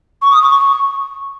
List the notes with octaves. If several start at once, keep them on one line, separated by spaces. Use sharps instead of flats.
C#6
D#6
C#6